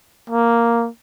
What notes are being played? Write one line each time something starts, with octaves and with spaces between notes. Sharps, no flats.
A#3